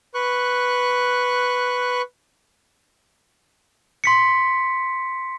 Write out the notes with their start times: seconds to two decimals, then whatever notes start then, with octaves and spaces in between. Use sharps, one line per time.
0.14 B4 C#6 F#6
4.04 C6 B6 C#7